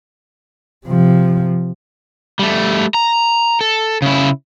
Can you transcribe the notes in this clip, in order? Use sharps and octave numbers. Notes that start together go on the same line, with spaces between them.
C3 F3
G3 A3
A#5
A4
C#3 E4